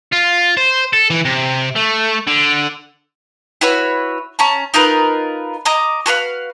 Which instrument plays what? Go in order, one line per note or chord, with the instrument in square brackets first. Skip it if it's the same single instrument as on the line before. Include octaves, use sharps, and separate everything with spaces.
[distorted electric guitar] F4
C5
A4
E3
C3
A3
D3
[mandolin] E4 F#4 B4 C#5
C#4 A5 A#5
D#4 F4 A#4 B4
D#5 A#5 D6 D#6
F#4 A4 B4 F5